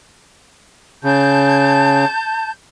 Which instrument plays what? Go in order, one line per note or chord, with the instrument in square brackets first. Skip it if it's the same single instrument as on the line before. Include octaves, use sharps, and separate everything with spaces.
[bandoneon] C#3 [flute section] A5 G6